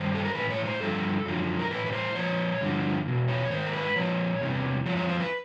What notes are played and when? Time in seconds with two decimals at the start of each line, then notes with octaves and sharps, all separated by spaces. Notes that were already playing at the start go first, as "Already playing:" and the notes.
Already playing: G2 D#3 C5
0.15 A4
0.25 A#4
0.35 A2 E3 B4
0.50 C#5
0.65 C5
0.80 G2 D3 F3 A4
1.25 F#2 D3 F3
1.59 A#4
1.71 A2 E3 B4
1.86 B4
1.93 C5
2.15 A#2 F3 C#5
2.61 G2 D3 F3
3.06 E2 B2
3.28 C#5
3.50 G#2 D#3 C5
3.67 A#4
3.73 B4
3.96 A#2 F3 C#5
4.41 E2 C3 E3
4.86 F2 C#3 F3 C#5
4.97 C#5
5.09 C5
5.20 B4